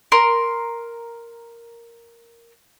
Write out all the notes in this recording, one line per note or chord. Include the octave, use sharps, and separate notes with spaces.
A#4 C6